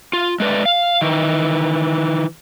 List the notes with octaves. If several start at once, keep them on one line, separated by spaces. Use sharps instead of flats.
F4
G#3 A3 B4 C5 D5
F5
D#3 E3